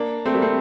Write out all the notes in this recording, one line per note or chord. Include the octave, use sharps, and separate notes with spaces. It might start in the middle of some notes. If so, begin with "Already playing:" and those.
Already playing: A#3 D4
A3 C4
G3 A#3
A3 C4